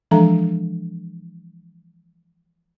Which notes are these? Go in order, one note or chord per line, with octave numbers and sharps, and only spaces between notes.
E3 F3 G#3 D4 A4 A#5